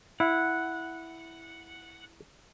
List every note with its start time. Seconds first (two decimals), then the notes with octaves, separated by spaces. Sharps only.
0.20 E4 F#5